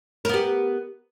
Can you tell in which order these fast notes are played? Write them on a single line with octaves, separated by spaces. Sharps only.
A#4 B3 G4